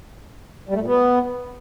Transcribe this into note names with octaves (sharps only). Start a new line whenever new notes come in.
G3
A3
A#2
B3